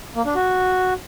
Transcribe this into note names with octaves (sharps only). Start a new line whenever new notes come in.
A#3
D4
F#4